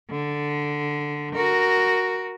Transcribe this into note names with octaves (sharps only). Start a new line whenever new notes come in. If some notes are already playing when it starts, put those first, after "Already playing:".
D3
F#4 A#4